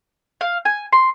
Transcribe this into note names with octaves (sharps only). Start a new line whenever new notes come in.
F5
G#5
C6